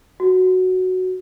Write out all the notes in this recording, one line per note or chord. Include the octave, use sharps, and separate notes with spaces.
F#4